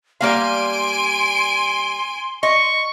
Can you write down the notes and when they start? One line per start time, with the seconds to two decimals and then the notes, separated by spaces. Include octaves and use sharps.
0.21 G3 A#3 F5 G#5 C6 D7
2.43 D#5 C#6